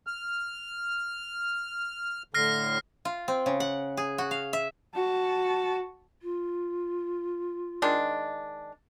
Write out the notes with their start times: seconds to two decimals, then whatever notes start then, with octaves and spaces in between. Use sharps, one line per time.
0.07 F6
2.34 A2 D3 F6 A#6 C7
3.05 F4
3.28 C4
3.46 C#3
3.60 F#5
3.97 G#4
4.18 F#4
4.31 F5
4.53 E5
4.94 F#4 A5
6.22 F4
7.82 D#3 G#3 D4